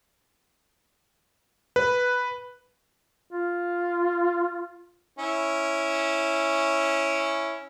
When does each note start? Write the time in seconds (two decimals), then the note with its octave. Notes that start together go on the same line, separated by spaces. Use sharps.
1.76 B4
3.31 F4
5.19 C#4 E4